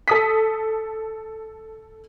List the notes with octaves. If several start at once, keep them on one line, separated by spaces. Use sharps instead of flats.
A4 D#6 B6